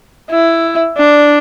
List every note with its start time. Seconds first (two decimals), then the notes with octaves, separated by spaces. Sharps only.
0.31 E4
0.98 D4